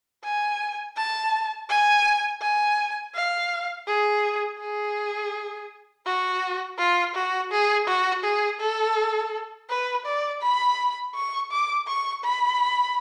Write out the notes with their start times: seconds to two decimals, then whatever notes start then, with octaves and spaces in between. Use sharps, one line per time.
0.24 G#5
0.97 A5
1.69 G#5
2.42 G#5
3.15 F5
3.87 G#4
4.60 G#4
6.06 F#4
6.78 F4
7.15 F#4
7.51 G#4
7.87 F#4
8.24 G#4
8.60 A4
9.69 B4
10.06 D5
10.42 B5
11.15 C#6
11.51 D6
11.88 C#6
12.24 B5